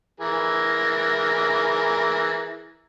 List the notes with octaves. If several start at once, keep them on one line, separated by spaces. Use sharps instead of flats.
E3 G#4 A#4